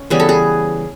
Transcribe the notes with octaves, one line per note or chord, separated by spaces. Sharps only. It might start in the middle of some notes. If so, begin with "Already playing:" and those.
Already playing: C#4
C#3 E3 G3 B3 G#4
A4
G#4